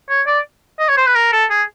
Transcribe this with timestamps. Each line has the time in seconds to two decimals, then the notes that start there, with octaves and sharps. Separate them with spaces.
0.09 C#5
0.27 D5
0.79 D#5
0.89 C#5
0.97 C5
1.06 B4
1.15 A#4
1.32 A4
1.50 G#4